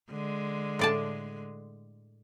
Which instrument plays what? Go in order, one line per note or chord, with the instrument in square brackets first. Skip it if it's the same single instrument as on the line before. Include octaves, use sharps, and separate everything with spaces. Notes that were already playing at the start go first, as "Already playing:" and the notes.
[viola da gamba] D3 G#3
[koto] A2 D5 A5